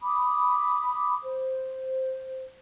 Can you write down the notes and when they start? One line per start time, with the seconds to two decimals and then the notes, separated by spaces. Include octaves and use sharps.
0.02 B5 D6 D#6
1.23 C5